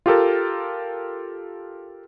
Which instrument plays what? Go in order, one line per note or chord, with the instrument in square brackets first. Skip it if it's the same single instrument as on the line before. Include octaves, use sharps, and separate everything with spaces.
[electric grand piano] F4 G4 A4 A#4